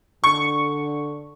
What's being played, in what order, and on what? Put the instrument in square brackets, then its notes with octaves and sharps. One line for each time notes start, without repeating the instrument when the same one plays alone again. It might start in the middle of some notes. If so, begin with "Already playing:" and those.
[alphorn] D3 [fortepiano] C#6